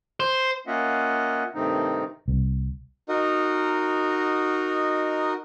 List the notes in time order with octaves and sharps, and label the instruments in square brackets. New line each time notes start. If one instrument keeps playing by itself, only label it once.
[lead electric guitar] C5
[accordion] A#3 C#4 F4 D#5 E5 F#5
G2 C3 D#3 A3 C4 D#4
[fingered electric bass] C2
[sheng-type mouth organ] D#4 F#4 A#4 D#5